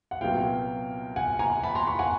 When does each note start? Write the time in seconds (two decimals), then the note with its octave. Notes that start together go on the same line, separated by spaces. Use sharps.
0.11 F#5
0.21 C2 A#2 F#3 B3 F5 G5
1.16 F#5 G#5
1.39 G#5 A#5
1.63 A5 B5
1.75 A#5 C6
1.87 B5 C#6
1.99 F#5 G#5